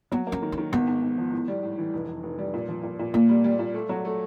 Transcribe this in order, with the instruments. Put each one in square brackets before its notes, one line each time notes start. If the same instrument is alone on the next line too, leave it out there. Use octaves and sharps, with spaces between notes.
[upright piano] F#3 [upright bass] B3
[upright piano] A#3
[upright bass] C#4
[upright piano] D#3
[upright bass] C#4
[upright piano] D#3
[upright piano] G#1 [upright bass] B3
[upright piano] G#2
G#2
F3
A2
G3
A2
E3
F1
F1
F1
G3
A#2
F3
A#2
A#2
[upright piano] A#2 [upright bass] A#3
[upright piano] G3
G3
A#2
A3
F#3
A3